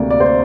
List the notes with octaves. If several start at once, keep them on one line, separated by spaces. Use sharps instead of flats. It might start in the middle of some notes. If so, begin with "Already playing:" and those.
Already playing: D2 C3 A#3 D5
D5
C5